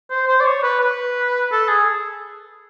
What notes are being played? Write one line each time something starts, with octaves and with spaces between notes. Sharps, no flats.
C5
C5
D5
C#5
B4
B4
A4
G#4